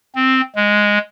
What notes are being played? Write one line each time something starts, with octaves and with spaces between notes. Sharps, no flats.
C4
G#3